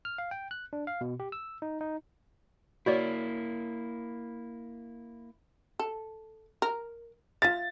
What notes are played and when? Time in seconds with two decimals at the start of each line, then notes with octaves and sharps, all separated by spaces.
0.05 F6
0.18 F5
0.31 G5
0.51 F#6
0.73 D4
0.87 F5
1.01 B2
1.20 G4
1.32 E6
1.62 D#4
1.81 D#4
2.86 A#3 E4 F#4 C#5 D5
5.79 A4
6.62 A#4
7.42 F4 E5 F5 A6